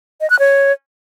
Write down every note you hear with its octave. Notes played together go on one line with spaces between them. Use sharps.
D#5
F#6
C#5